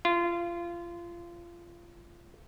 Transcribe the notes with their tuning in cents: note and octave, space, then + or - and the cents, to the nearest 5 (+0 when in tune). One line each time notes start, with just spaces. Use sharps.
F4 -25